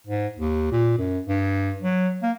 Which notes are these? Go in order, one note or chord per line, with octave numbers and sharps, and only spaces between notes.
G#2
D#2
A#2
F#2
G2
F#3
A#3